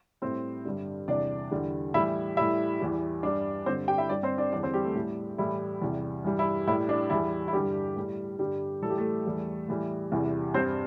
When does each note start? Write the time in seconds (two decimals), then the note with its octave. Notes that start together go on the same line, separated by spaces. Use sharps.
0.22 A2 G3 C4 C5
0.65 G2 D3 G3
1.08 E2 C3 G3 D4 D5
1.51 E2 D3 G3
1.94 A2 E3 G3 E4 E5
2.37 A2 G3 E4 E5
2.80 E2 E3 G3
3.23 G2 G3 D4 D5
3.66 G2 D3 G3 C4 C5
3.88 G4 G5
3.98 E4 E5
4.09 G2 G3 D4 D5
4.23 C4 C5
4.38 D4 D5
4.52 E2 D3 G3 D4 D5
4.63 C4 C5
4.74 G3 G4
4.84 A3 A4
4.95 A2 G3
5.38 A2 E3 G3 E4
5.82 E2 C3 G3
6.24 G2 E3 G3
6.39 E4
6.67 A2 G3 E4
6.89 D4
7.10 E2 E3 G3 E4
7.48 E4
7.53 G2 D3 G3 G4
7.96 A2 G3
8.39 G2 D3 G3 G4
8.82 A2 E3 G3 A4
8.90 G4
8.98 A3 A4
9.26 E2 E3 G3
9.68 A2 E3 G3
10.12 E2 C3 E3 G3
10.54 G2 G3 C4 C5